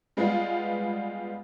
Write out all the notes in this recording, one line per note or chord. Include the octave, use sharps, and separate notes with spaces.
G3 G#3 B3 F4